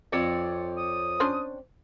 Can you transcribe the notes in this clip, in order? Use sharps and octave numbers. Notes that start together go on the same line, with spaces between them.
F2 C4 C#5 D5
D#6
C#4 D4 C5